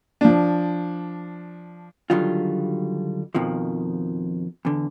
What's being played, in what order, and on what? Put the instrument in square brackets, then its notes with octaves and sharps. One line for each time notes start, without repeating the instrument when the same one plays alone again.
[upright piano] F3 D4
[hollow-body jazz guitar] D3 D#3 F#3 G3 F4
F2 B2 D#3 F3
E2 D3